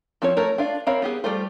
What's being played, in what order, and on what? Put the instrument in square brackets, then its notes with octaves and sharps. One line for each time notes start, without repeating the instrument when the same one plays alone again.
[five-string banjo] F3 C4 F4 C#5
A3 A#4 C#5
D4 F4 F5
C4 A#4 C#5 F5 B5
B3 G4 G#4
G3 A3 F4 C5